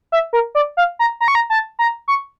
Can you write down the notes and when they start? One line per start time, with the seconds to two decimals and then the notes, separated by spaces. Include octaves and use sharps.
0.12 E5
0.33 A#4
0.55 D5
0.77 F5
0.99 A#5
1.21 A#5
1.28 C#6
1.35 A#5
1.50 A5
1.79 A#5
2.08 C#6